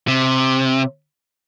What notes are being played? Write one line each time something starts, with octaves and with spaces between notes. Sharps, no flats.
C3